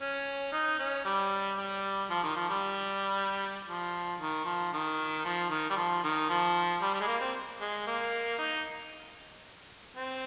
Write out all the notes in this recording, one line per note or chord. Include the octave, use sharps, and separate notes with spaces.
C#4
D#4
C#4
G3
G3
F3
D#3
F3
G3
F3
D#3
F3
D#3
F3
D#3
G3
F3
D#3
F3
G3
G3
G#3
A#3
C4
G#3
A#3
D#4
C4